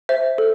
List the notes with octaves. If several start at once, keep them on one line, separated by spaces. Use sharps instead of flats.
C5 E5
A4